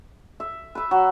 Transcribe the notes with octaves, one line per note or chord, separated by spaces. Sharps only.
E5
B4 E5
F#3